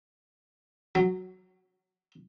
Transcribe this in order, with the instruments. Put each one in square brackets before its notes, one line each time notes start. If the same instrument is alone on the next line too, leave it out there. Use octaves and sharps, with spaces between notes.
[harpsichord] F#3